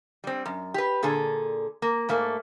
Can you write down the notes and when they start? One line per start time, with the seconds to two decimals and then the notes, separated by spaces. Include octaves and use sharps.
0.24 G3 C4
0.46 F#2
0.74 G4 B4
1.03 A#2 D3 G#4 A4
1.82 A#3
2.09 G#2 A3 A#3